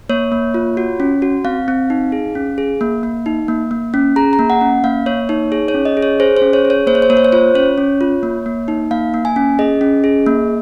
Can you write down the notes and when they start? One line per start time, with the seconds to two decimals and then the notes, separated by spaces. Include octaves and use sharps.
0.09 A#3 C#5
0.32 A#3
0.54 F4
0.77 F#4
1.00 C#4
1.22 F#4
1.45 C4 F5
1.68 C4
1.90 D#4
2.12 G#4
2.35 C#4
2.58 G#4
2.81 A#3
3.03 A#3
3.26 D#4
3.48 A#3
3.71 A#3
3.94 C#4
4.16 G#4 A#5
4.33 A#5
4.39 A#3
4.50 F#5
4.61 C#4
4.84 A#3 F5
5.06 A#3 C#5
5.29 D#4 C#5
5.52 G#4 C#5
5.68 C#5
5.74 C#4
5.85 D#5
5.97 G#4
6.02 C#5
6.20 G#4 C5
6.37 C5
6.42 C#4
6.53 C#5
6.65 G#4
6.70 C#5
6.87 A#3 C5
6.95 C#5
7.02 C5
7.10 A#3 C#5
7.17 C5
7.25 C#5
7.32 F4 C5
7.55 C#4 C#5
7.78 C#4
8.01 F4
8.23 A#3
8.46 A#3
8.68 D#4
8.91 A#3 F5
9.14 A#3
9.25 G#5
9.36 C#4
9.59 G#4 D#5
9.81 C#4
10.04 G#4
10.26 A#3